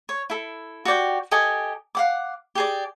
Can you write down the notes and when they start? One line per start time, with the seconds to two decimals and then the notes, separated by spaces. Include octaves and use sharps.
0.09 C#5
0.30 E4 A4
0.85 F#4 G4 D5 G5
1.31 G4 A4 D#5 G#5
1.95 F5 F#5 D6
2.55 G4 G#4 D5